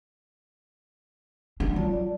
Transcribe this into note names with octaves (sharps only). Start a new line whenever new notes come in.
F#3 D4
F#3 F4 D5 A5